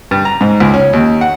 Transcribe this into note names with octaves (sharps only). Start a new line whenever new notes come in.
G2
A#5
G#2
C#2
C#4
D#2
F#5